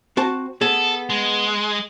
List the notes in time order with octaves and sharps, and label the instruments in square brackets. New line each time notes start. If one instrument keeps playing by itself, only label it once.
[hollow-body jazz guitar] C4 F#4 A5
[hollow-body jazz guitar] B3 G#4 [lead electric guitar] A4
[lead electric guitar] G#3